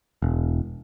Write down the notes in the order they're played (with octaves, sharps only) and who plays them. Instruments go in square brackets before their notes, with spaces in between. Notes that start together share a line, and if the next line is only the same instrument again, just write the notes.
[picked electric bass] E1